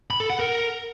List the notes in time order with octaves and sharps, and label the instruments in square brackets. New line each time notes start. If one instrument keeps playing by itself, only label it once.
[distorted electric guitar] B5
A4
F#5
A#4